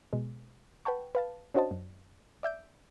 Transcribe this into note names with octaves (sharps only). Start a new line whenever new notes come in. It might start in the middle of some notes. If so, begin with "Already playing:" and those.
B2 G#3
B4 F#5 G5 A5 C#6
B4 F5 A5
C#4 D4 F#4 C5 D#5 A5
F#2
D5 E5 G6 D7